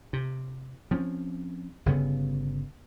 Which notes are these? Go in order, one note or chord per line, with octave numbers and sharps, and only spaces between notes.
C3
F3 C4 C#4
G1 C#3 B3